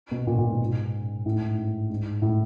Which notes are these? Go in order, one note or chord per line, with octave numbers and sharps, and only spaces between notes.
B2
A#2
A#2
G#2
A2
G#2
G#2
G#2
A2